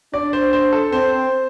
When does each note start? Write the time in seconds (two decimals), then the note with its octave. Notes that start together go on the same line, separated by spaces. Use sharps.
0.13 D4 D5
0.33 C5
0.53 C5
0.73 A4
0.92 C4 C5